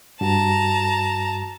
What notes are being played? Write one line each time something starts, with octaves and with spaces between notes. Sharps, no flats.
G2 F#4 A5 A#5